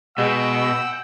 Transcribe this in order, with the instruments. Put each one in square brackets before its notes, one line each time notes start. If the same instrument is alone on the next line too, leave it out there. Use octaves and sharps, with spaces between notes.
[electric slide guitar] B2 [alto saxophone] G#3 [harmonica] F#5 G5 [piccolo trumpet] E6